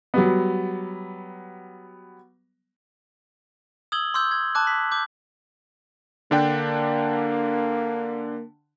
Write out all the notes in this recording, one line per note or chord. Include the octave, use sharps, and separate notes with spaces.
F#3 G3 B3
D#6 E6 G#6 F#7 G7
C6 D6 E6 G6
G#6
A5 D6 F#6
B6 F#7
D6 G6
D3 A#3 D4 G5